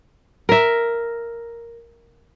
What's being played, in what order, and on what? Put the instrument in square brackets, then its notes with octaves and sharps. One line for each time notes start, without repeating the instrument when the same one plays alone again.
[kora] A#4 E5